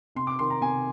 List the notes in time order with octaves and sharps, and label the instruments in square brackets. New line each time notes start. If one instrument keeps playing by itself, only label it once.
[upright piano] C3 C6
D6
D#3 C6
A#5
C3 G#5